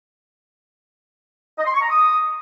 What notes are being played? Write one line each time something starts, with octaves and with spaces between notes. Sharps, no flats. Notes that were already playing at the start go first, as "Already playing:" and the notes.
D#5
C6
C#6
A#5
D#6